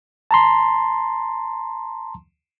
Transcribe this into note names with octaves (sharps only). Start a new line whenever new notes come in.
A5 A#5 C6